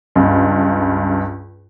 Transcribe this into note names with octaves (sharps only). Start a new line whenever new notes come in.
C#2 G2